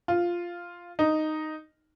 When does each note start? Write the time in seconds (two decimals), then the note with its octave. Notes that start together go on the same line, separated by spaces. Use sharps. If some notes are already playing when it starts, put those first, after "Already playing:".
0.08 F4
0.99 D#4